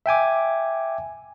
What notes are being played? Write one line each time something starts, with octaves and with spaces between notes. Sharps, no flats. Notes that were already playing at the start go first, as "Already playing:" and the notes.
E5 G5 G#5 D6